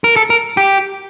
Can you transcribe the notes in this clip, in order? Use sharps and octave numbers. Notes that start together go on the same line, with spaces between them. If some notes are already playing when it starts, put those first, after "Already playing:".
A#4
A4
A#4
G4